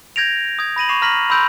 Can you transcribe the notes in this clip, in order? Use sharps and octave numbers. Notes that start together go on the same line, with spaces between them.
G6 G#6 A#6 D7 F7
D#6 G#6
B5 A#6 D#7 F#7
C#6 D6 C7 E7 F7
A#5 F6 A#6 B6 F#7
B5 C6 E6 G6 D7 F7